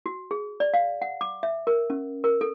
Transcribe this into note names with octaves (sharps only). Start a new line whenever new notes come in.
F#4
G#4
D5
F5
F#5
D6
E5
A#4
C#4
A#4
A4